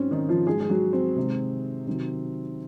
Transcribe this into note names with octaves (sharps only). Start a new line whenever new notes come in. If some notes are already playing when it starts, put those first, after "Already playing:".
Already playing: G#2 F#3 C4 C#4
D#3 D#4
F3 F4
G#2 F#3 G#3 G#4
G#4
F#3 F#4
C4
C3 D#3 G#3
C3 D#3 F#3